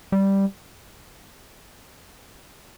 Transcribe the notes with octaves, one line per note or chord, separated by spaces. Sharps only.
G3